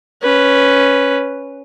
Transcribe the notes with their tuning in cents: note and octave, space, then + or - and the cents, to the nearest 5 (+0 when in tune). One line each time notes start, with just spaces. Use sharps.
C#4 +0 B4 +0